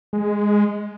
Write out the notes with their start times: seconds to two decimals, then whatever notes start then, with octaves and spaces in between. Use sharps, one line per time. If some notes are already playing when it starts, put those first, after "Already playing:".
0.13 G#3